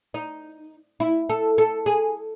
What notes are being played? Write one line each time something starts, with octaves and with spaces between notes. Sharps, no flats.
D#4
E4
A4
A4
G#4